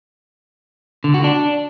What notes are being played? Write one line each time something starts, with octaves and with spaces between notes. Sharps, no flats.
D3
F#4
D4